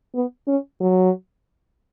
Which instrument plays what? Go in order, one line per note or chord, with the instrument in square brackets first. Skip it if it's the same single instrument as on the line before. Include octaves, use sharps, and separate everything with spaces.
[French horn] B3
C#4
F#3